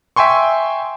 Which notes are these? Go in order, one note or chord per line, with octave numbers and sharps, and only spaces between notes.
E5 G5 G#5 C6 C#6